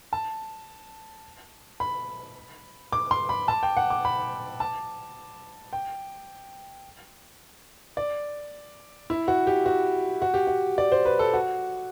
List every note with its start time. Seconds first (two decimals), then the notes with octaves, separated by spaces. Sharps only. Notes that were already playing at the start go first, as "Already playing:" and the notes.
0.13 A5
1.80 B5
2.92 D6
3.11 C6
3.29 B5
3.48 A5
3.63 G5
3.77 F#5
3.90 D6
4.05 B5
4.60 A5
5.73 G5
7.97 D5
9.10 E4
9.28 F#4
9.47 G4
9.66 F#4
10.22 F#4
10.34 G4
10.47 F#4
10.78 D5
10.92 C5
11.05 B4
11.19 A4
11.34 F#4